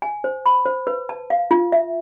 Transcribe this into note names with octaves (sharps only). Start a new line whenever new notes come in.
G#5
C5
B5
C5
B4
A5
F5
F4
E5